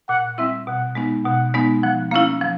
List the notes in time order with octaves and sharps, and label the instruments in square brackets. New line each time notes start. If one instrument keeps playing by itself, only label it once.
[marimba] A#2 [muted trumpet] F#5
[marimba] G3 C4 E4 [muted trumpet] E5
[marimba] B2 [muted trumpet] F#5
[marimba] G#3 B3 D#4
[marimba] B2 [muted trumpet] F#5
[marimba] G#3 B3 D#4
[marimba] F3 [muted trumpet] F#5
[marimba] A#3 C#4 E4 [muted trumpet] F5
[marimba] F3